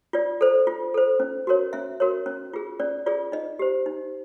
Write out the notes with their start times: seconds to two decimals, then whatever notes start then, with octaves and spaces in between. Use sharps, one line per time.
0.13 F4 D5
0.41 A4 C5
0.67 F4
0.94 A4 C5
1.20 C#4
1.47 F#4 A#4 C#5
1.73 C#4 E5
2.00 F#4 A#4 C#5
2.26 C#4
2.53 F4 G#4
2.80 C#4 D5
3.06 F4 G#4 D5
3.32 D#4 D#5
3.59 G4 C5
3.86 D#4